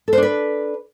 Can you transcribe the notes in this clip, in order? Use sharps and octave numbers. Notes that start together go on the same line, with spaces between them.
D4 A4 B4 C5